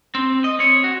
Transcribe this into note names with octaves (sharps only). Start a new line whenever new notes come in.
C4
D#5
C4 C#5
F#4